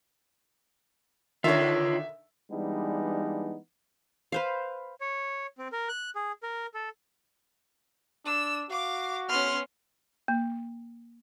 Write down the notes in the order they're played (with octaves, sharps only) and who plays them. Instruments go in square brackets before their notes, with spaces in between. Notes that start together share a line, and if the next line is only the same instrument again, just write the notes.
[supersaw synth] D3 D#3 [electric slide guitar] F4 C#5 [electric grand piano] E5
[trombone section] E3 G3 G#3 B3 D4 D#4
[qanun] B4 C5 F5
[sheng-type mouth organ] C#5
C4
A#4
F#6
G#4
A#4
A4
[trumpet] D4 [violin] E6
[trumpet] F#4 [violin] F5 D6
[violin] B3 C#4 [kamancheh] C6 F6
[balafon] A#3